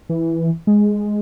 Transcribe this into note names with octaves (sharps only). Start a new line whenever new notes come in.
E3
G#3